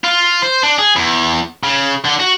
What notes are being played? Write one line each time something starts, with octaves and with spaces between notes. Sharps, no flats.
F4
C5
D4
G#4
E2
C#3
D3
F#4